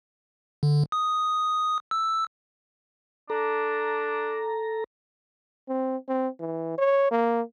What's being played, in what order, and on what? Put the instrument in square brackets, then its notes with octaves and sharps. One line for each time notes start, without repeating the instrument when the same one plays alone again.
[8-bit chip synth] D3
D#6
E6
[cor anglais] D4 [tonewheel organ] A4 A#5
[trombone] C4
C4
E3
C#5
A#3